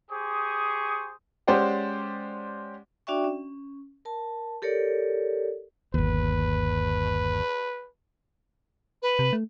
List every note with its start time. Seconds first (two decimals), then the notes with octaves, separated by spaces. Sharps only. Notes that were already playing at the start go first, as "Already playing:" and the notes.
0.10 G4 G#4 C5 C#6 D#6
1.47 G#3 C#4 G4 C5 D5 F#5
3.07 D4 F#4 D5 E5 G5 C#6
3.24 C#4
4.05 A#4 A5
4.62 G4 A4 A#4 C#5 D5
5.94 G1 D#2 B4
9.02 B4
9.19 C3
9.33 A3